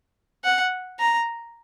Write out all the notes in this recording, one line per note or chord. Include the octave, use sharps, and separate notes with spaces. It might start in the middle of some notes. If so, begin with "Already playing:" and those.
F#5
A#5